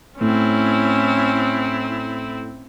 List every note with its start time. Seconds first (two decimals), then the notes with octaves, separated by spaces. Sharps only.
0.21 A2 C4 C#4 E4